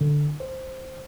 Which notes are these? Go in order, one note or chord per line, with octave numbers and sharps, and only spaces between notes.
D3
C5